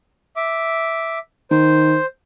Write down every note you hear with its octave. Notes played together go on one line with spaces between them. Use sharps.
E5 D6
D#3 C5